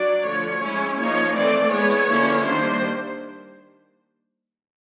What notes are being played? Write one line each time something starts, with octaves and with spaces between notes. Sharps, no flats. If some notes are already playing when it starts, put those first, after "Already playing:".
Already playing: F#3 D4 D5
D3 F3 A3 C#5
G#3 C#4 E4
F3 A#3 D#4 C#5
E3 A3 C4 D5
G#3 B3 E4 C#5
D3 F3 A#3 C#4 E4
D#3 G3 A#3 D4 C5